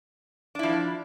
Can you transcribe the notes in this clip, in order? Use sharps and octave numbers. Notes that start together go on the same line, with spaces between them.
F3 D4 E4